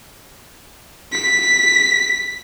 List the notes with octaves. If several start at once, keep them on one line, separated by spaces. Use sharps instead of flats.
B6